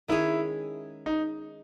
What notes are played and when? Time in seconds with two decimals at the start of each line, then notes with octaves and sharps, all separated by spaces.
0.08 D#3 G#3 C#4 E4 G#4 C#5
1.06 D#4